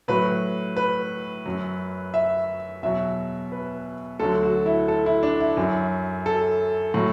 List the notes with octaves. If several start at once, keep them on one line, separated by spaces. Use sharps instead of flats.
A2 F#3 B4
B4
F#2 F#3
E5
E2 B2 F#3 E5
B4
D2 D3 F#3 A4
F#4
E4
A4
E4
D4
E4
F#2 F#3
A4
A2 F#3